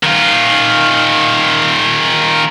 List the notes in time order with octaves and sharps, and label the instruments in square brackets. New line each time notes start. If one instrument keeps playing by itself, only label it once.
[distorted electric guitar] D#3 F4